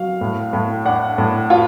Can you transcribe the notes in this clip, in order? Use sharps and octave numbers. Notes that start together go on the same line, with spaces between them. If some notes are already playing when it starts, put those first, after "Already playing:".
Already playing: F#3 F5
A2
A2
D4 F#5
A2
F4